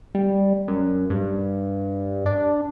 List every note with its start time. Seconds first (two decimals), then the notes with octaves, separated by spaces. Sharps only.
0.15 G3
0.68 F#2
1.10 G2
2.26 D4